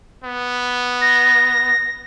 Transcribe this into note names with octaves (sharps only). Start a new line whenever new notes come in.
B3
A#6